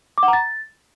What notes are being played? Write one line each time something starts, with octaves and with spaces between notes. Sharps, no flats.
D6
F#5
A#5
A6